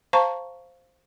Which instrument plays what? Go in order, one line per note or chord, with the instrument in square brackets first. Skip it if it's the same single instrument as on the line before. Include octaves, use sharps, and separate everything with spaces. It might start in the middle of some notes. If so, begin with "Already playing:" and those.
[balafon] C5 F5 A5 A#5 C#6